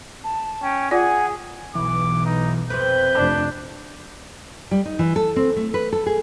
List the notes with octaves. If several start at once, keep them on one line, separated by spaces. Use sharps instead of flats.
A5
C#4 G5
F4 G#4 D5 F#5 G#5
B1 E3 D6
D#4
F2 C3 C4 B4 G6
F1 D4
G3
D#4
E3
A4
C4
A3
B4
A4
G#4